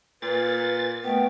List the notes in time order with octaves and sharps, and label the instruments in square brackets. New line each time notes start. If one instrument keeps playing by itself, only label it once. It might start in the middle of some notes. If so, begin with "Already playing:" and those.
[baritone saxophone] A#2 [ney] B4 [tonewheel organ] A6
[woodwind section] B2 A3 B3 [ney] G5